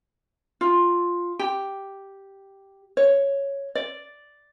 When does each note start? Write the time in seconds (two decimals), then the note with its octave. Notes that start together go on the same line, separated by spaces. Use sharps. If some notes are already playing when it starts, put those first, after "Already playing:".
0.61 F4
1.39 G4
2.97 C#5
3.75 D5